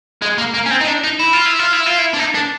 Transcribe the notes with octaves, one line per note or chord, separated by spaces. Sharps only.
G#3
A#3
A#3
C#4
C4
D#4
D4
D#4
E4
F4
E4
F4
E4
F4
E4
D4
D#4
D4